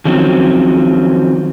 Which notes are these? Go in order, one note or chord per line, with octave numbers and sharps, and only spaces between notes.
D#3 F3 F#3 C4 C#4